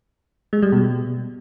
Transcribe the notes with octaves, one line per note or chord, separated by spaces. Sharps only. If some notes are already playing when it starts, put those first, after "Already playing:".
G#3
G3
B2